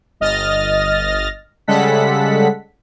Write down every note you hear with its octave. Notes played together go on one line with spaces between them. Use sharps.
G1 D#5 F6 A6 A#6
C#3 G3 G#3 A4 F#5 B6